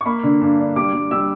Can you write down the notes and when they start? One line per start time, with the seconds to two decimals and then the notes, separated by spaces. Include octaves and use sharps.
0.01 C#6
0.06 A#3 B5
0.23 D3
0.41 G2
0.59 D4
0.76 G3 D6
0.94 G3
1.11 G3 E6